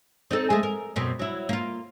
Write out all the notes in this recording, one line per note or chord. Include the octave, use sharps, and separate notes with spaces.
C4 D#4 A4
G#3 A3
A#4
F#2 B2 C4
F#3 E4
A#3 F4